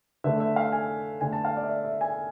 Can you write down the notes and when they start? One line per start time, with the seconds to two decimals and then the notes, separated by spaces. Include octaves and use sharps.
0.24 D3 A3 E5
0.40 E5
0.56 F5
0.72 G#5
1.21 D3 A3 G#5
1.33 A5
1.45 F5
1.57 D5
1.63 E5
1.69 D5
1.85 E5
2.01 G#5